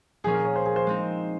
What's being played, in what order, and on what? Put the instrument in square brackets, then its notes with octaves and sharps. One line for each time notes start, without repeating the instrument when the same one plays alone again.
[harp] A#2 F3 A#3 C#4 [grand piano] G#4
[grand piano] A#4
C#5
C5
G#4
C5
[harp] G#3 C4 D#4